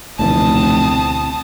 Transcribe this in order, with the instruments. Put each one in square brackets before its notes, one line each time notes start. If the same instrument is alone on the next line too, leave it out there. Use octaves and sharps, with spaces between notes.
[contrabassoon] F1 [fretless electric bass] D2 B2 E3 [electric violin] C4 D#6 [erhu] A5